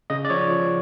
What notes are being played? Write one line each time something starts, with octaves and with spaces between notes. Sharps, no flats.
C#3 D#5
D5
F3 C#5
F3